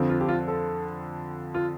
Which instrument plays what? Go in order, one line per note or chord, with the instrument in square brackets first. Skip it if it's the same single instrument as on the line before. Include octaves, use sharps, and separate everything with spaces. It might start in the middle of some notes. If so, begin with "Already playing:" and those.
Already playing: [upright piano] F2 D3 F3 C4
[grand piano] F4
G4
F4
A4
F4